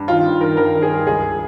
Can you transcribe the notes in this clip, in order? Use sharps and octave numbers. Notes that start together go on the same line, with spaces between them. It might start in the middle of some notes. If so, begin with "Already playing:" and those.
Already playing: G2
D#3 F4
G2
D#3 A#4
G2 A#4
D#3
G#4
G2
C#2 G#4